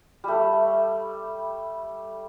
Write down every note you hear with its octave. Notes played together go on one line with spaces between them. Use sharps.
G3 A3